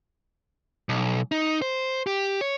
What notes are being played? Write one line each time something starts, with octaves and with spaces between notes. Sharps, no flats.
B1
D#4
C5
G4
C#5